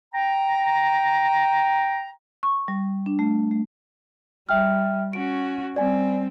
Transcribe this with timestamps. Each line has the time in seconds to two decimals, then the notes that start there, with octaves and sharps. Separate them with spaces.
0.14 G5 A#5
2.43 C#6
2.68 G3
3.06 D4
3.19 A3
3.51 A3
4.49 G3 E5 G5 F6
5.13 C#4 F#4 D7
5.76 G3 C4 D5 G#5